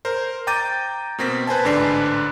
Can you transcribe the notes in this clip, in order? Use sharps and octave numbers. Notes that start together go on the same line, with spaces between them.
A#4 C5
G5 A#5 D6 G6 A6 D#7
B2 A#3 C4 A#6 B6
B4 C5 G#5 A5
A1 G#2 D3 D4 B4 C7